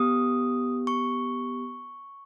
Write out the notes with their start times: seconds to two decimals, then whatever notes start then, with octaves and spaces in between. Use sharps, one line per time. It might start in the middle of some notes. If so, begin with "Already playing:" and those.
Already playing: B3 G4 D#6
0.87 C#6